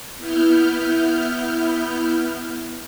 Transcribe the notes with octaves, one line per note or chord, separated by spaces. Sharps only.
B3 E4 F6 G6